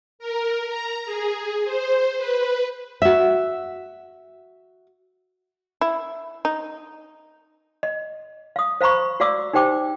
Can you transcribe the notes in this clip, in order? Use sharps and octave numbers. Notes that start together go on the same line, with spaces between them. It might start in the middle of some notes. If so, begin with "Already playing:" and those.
A#4
A#5
G#4
C5
B4
F#4 E5
E4
D#4
D#5
F5 D#6
C5 F5 A#5 B5 C#6
F#4 D5 F5 D6 E6
D#4 G4 C5 G5 D6